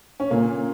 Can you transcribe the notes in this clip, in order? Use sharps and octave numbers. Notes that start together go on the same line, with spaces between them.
C#4
A#2 A#3